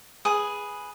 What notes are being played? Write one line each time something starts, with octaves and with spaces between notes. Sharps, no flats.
G#4 B4 G#5 D#6